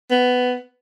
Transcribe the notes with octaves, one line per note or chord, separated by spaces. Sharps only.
B3